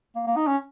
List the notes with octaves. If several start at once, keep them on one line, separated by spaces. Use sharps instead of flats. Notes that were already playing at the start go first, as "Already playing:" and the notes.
A#3
A#3
D#4
C#4